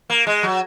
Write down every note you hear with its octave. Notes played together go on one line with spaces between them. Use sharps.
A#3
G#3
F#3